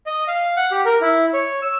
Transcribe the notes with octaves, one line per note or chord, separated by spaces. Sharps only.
D#5
F5
F#5
G4
A#4
E4
C#5
E6